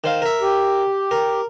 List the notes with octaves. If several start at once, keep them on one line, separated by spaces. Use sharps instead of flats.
D#3 C5 F5
A#4 E5
G4
A#4